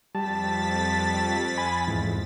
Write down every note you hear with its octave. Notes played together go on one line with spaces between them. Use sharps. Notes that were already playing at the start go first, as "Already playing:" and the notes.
F2 G3 A5 A6 B6
G#5 B5
E2 G#2